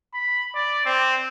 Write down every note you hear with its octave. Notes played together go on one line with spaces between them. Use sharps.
B5
D5
C4